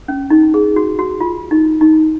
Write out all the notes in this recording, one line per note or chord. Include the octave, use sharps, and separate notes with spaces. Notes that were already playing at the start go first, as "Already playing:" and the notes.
C#4
D#4
G#4
F#4
F#4
F4
D#4
D#4